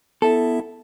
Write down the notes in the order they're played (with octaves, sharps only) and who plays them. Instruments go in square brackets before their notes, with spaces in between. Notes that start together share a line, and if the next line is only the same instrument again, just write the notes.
[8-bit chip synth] B3 E4 E5 [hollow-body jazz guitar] A4